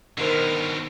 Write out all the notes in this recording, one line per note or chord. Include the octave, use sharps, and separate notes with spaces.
B2 D3 D#3 A#4 C5 D#5 F6